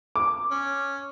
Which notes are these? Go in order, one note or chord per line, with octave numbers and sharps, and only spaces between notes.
D6
C#4